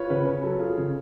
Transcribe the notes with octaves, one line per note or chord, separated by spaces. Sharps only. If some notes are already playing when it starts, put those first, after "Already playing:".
Already playing: F4 B4 C#5
C#3 B4
C#4 B4
F#3 A4
F4 G#4
C#3 G#4